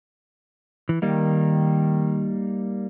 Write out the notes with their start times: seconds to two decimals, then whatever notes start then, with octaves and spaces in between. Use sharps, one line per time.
0.89 E3
1.02 D#3 G3 A#3 D#4